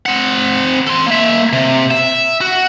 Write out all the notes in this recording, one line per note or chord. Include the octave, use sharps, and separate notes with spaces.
C4 F#5
A4 C6
A#3 E5
C3
E5
F#4